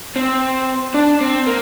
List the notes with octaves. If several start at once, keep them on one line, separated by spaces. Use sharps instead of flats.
C4
D4
C4
A#3